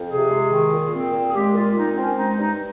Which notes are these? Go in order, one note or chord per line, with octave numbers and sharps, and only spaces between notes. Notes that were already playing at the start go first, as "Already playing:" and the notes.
Already playing: F2
C3 G#4
G#3
D#3
A#2
C4
A#2
G#4
G#3 G4
A#2 F4
C4 D#4
C4 C#4
G#3 D#4
G2 D#4